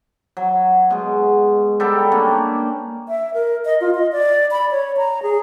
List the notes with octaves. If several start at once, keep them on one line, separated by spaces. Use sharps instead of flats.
F#3
B2 G#3
G3 A4 G5 A#5
A#3 C#4 D4
E5
A#4
D#5
F4
D#5
D5
B5
C#5
A#5
G#4